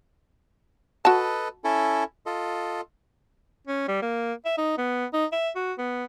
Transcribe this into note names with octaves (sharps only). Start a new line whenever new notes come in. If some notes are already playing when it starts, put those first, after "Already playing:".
F#4 A4 B4 D#5 A5
C#4 E4 A4
F4 A4 D#5
C#4
G3
A#3
E5
D#4
B3
D#4
E5
F#4
B3